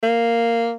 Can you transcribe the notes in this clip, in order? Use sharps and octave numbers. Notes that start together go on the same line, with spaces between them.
A#3